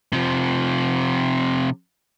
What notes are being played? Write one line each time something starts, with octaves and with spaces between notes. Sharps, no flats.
C3 F3